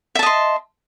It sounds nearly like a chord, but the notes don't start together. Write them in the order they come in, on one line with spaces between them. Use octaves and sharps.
E5 A5 D#5 C6